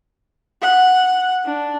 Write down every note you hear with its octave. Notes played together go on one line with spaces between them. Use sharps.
F#5
D4